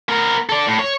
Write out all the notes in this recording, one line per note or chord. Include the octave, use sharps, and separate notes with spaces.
B3 A#4
A4 D5
A2
C#5